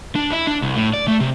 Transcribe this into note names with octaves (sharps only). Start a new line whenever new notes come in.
D4
E4
D4
C2
A2
D5
A3
C3